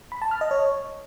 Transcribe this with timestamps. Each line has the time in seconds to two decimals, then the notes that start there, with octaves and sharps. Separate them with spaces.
0.12 B5
0.22 A5
0.31 F6
0.41 D#5
0.51 C#5